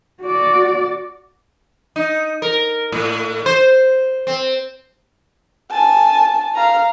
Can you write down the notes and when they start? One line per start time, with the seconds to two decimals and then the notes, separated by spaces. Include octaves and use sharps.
0.22 F#4 D5
1.96 D#4
2.42 A#4
2.92 A2
3.46 C5
4.27 C4
5.71 G#5 A5
6.55 F5 A#5